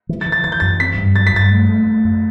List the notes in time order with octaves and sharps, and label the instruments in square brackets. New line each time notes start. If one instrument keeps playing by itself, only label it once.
[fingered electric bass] E3
[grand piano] A6
[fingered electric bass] E3
[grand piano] A6
[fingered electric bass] E3 [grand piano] A6
[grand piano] G6
[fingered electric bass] F#2 [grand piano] A6
[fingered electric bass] C4 [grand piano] B6
[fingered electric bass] G2
[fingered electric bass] F#3 [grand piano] A6
[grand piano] B6
[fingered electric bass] G2 [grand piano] A6
[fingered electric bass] A3
A3
A3
F#2